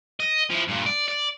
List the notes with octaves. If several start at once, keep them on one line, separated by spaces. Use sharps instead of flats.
D#5
F3 E4
G2 A#2
D5
D5